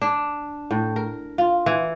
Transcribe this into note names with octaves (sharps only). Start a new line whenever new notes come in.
D4
A2
A#4
F4
E3